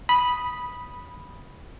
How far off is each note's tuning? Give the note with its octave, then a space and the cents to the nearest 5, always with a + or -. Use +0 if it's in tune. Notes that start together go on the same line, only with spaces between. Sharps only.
B5 -10 D#6 +0